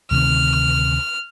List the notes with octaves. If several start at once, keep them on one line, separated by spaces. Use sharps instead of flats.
D2 C3 D#3 F6